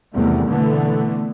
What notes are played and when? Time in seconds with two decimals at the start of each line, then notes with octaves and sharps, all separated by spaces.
0.14 E2 C3 D#3 G3 A3
0.48 B2 D3 E3 A3 B3